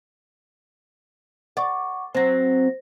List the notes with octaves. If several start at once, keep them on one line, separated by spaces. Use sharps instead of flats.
D5 F#5 C#6 D6
F#3 C4 C5 A#6